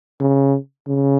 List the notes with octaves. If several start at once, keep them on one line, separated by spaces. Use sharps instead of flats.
C#3
C#3